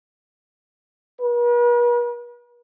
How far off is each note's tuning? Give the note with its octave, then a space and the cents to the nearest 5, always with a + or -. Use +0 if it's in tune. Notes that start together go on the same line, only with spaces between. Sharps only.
B4 -45